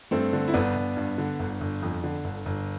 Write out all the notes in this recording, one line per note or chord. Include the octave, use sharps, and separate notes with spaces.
G2 A3 C4
D3
E4
G1 B3 D4
G1
G2
D3
G1
G1
F2
D3
G1
G1